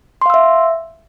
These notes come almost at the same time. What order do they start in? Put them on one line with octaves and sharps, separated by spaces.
C6 F5 E6 E5